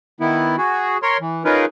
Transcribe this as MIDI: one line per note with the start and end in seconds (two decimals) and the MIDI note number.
0.20 0.56 51
0.20 0.56 59
0.20 0.56 64
0.58 0.98 66
0.58 0.98 68
1.02 1.17 70
1.02 1.17 73
1.02 1.17 84
1.21 1.43 52
1.45 1.65 61
1.45 1.65 63
1.45 1.65 65
1.45 1.65 68
1.45 1.65 70
1.45 1.65 71